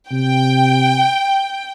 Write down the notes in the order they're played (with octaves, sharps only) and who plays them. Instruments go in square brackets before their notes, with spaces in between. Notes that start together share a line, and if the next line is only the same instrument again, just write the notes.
[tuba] C3 [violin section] G5